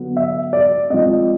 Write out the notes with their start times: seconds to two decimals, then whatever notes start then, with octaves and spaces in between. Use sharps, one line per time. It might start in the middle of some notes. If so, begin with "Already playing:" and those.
Already playing: D3 F#3 B3
0.17 E5
0.53 D5
0.90 F3 G#3 C4 D#5